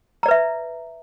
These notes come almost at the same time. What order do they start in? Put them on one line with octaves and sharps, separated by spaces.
A#5 D5 B4 E5